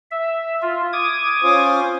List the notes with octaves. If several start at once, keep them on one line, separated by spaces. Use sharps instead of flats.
E5
F4
D6 D#6 G#6
C#4 F4 C5